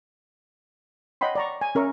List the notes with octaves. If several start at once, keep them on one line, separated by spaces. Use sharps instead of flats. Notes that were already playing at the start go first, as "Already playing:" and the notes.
C#5 D#5 F#5 G5 B5 C6
D5 A#5 C#6
G#5
C#4 A#4 E5 C#6